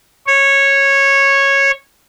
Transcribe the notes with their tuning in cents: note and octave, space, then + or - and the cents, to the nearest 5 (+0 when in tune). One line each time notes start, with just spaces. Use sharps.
C#5 -10